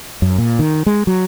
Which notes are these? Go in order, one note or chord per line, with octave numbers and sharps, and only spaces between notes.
F#2
A#2
D#3
G#3
F#3